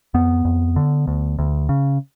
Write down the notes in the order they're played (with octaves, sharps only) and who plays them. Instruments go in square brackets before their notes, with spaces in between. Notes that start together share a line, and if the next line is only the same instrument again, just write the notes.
[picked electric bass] F2 B3
F2
D3
D2
D2
C#3